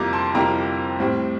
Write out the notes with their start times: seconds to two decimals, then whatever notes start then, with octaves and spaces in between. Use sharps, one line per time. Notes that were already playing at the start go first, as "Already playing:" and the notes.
Already playing: F2 C3 G3 A#3 E4 A#5 D6
0.13 A5 C6
0.34 F2 C3 G3 A#3 E4 G5 A#5
1.00 A2 G3 C4